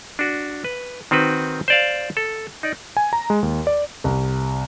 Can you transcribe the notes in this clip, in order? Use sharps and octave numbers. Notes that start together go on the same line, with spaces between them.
D4 F#4
B4
D#3 C4 F#4 B4
C5 D5 F5
A4
D#4 D5
G#5
A#5
G#3
D#2
D5
C2